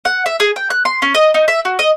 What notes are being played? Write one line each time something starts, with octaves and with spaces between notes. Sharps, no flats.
F#5
E5
G#4
G5
F#6
C6
C#4
D#5
D#4
E5
F#4
D#5